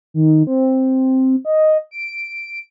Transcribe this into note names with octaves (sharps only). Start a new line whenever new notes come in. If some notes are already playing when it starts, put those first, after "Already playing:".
D#3
C4
D#5
D7